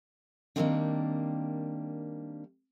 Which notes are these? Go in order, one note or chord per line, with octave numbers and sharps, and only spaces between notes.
D#3 G3 A3 A#3 C4 D4